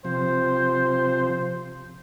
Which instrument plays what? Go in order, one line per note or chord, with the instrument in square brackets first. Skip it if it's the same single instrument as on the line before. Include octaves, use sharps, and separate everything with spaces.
[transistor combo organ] C3 F3 [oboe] C5